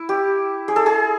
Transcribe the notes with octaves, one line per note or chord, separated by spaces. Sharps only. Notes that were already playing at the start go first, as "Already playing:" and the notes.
Already playing: E4
G4
G#4
A4
G#4